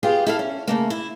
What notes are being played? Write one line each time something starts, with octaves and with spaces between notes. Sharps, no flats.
B3 F4 G4 G#4 F5
E4 A4 F5
C#4
C#3 A3 A#3
E4